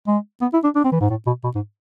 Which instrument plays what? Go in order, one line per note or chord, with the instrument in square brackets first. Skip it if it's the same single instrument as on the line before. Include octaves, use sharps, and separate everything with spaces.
[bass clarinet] G#3
B3
E4
D4
D4
C4
E3
G#2
A2
B2
B2
G#2